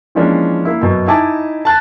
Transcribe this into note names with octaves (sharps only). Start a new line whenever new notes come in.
E3 F3 G#3 A#3 C#4 D4
A#3 E4
F#2 B2
D#4 E4 D#5 G#5 A5 D6
A5 F#6 A6